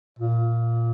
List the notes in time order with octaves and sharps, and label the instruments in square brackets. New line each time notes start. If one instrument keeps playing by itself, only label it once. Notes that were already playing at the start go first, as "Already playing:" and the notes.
[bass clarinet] A#2